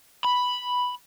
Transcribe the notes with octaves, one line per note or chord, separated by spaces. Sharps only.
B5